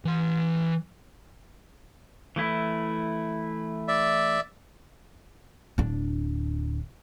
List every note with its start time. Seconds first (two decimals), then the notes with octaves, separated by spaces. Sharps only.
0.05 E3 C6
2.36 E3 A3 E4
3.88 D5 E5
5.78 D1 D4